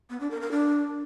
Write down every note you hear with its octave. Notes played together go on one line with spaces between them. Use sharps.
B3
D4
A#4
A#4
D4